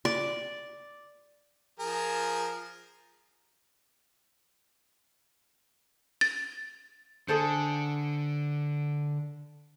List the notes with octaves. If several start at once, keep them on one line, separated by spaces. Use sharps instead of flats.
D5
F3 G#4 A#4
A6
D3 G#4 A4 C5